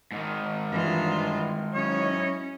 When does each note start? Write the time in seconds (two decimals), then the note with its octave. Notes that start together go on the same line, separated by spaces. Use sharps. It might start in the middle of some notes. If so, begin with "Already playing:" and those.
0.12 G#2 D#3
0.71 G2 D3 E3 G#3 F4
1.74 F#3 C#4 E4 C#5 D#5